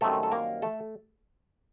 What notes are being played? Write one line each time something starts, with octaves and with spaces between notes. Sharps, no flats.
F#2 D#3 G3 A3 C4 A4
A4
A#3 A#4
A3 A4